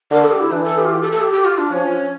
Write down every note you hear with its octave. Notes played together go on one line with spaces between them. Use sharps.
D3 A#4
A4
G4
E4
E3 D4
A4
G4
F4
G4
A4
A4
G4
G4
F4
D4
F3 C#4